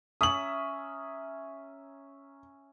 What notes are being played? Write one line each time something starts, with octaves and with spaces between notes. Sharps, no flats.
C#4 E5 A#5 D#6 F#7